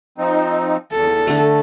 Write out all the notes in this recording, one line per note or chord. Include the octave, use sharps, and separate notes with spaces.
F3 C4 D#4
E2 A4
D3 A3